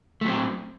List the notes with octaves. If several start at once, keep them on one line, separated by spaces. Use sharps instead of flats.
F#3 A3 C4